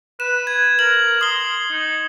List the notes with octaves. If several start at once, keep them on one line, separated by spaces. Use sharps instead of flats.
B4 E7
G#6
A#4 F#7
C6 D#6 G7
D#4